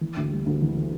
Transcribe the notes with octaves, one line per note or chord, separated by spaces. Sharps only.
E3
D2
G3
D2
E3
E3